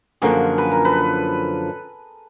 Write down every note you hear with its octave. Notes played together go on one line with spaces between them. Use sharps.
F#2 D3 F3 A#3 G#4 A#4
B4
A#4
A4 B4